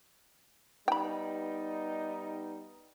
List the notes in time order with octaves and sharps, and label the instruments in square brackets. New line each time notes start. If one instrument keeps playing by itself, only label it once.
[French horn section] G3 B3 D#4 [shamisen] G5 B5